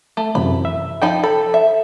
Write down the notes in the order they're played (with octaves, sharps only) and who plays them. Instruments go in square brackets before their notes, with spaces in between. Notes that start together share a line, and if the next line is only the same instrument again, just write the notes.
[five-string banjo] A3
[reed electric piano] F#2 C3 E3 [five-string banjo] B5
[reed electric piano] E5
[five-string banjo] F3 D#4 B5 [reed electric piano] G5
[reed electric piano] A4 [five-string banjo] B5
[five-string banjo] E5